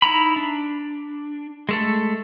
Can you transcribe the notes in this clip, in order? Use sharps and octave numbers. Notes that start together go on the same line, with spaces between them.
D#4 E4 A#5 B5
D4
G#3 A3 A4